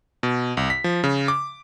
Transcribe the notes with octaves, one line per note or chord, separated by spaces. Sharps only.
B2
C2
B6
F3
C#3
D6